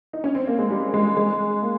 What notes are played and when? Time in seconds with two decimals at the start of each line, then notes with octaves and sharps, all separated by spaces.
0.13 D#4
0.24 C#4
0.35 C4
0.47 A#3
0.59 G#3
0.71 G3
0.94 G#3
1.17 G#3
1.62 A#3